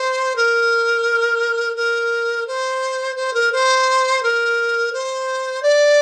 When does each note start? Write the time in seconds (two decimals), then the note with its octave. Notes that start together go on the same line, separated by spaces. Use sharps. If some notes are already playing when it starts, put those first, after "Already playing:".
Already playing: C5
0.36 A#4
1.76 A#4
2.47 C5
3.16 C5
3.33 A#4
3.52 C5
4.22 A#4
4.92 C5
5.62 D5